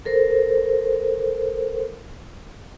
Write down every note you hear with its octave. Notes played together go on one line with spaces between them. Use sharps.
A4 A#4 C5